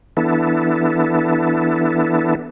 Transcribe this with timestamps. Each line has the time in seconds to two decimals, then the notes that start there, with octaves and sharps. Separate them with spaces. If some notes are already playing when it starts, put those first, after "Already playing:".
0.17 E3 B3 D4 E4 A4